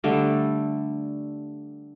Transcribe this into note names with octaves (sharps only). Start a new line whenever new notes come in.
D3 G3 A3